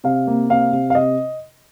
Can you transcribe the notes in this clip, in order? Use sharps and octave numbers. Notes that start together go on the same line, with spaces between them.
C3 F5
A#3
C3 F5
C3
F5
C3 D#5